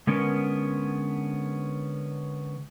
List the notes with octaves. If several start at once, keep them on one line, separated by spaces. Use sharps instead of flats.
D3 G#3 B3 C#4 A#4